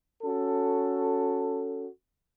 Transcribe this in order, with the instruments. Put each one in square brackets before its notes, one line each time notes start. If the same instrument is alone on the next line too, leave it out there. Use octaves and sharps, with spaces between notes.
[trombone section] C#4 F#4 A4